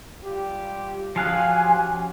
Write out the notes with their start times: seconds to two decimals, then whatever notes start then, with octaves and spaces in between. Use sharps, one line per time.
0.24 G3 F4 G4
1.16 F3 C#4 F#4 G4 F5 G#5 F#6